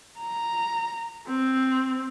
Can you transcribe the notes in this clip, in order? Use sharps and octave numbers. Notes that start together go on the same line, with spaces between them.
A#5
C4